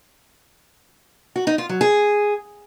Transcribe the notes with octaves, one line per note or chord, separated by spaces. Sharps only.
F#4
D#4
F4
F#3
G#4